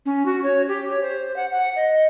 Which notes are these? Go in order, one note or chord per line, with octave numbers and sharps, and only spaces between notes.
C#4
F#4
C#5
G4
C#5
C5
F#5
F#5
D#5